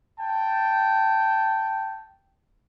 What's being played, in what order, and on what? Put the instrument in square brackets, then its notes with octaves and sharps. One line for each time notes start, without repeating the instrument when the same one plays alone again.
[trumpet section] G5 A5